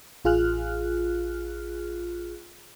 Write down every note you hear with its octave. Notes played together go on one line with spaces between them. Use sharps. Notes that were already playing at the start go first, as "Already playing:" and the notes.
A1 F4 G#4 F6 F#6